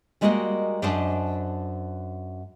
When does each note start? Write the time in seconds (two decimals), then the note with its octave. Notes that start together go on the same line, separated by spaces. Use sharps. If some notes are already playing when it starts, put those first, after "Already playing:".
0.21 G3 G#3 A#3 F#4 A#4 D#5
0.82 F#2 D4 C5 D#5 A5